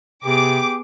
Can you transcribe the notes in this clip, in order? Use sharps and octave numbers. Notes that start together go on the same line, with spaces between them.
C3 B3 G4 G#4 D6